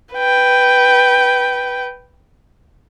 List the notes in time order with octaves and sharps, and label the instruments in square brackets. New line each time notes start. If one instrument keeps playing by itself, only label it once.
[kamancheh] B4 G5